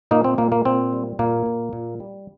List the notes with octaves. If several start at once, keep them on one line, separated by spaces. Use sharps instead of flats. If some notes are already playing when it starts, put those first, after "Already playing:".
A#2 A#3 D#4
C4
A#2 A#3
A#3
A#2 C4
G3
A#2 A#3
A#2
A#2
G3